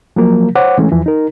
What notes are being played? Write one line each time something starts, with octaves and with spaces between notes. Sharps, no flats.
F3 F#3 A#3 A#4
C5 C#5 F#5 D6
E3 G#3 A3 C#4
E2 E3 F3
D#4 A#4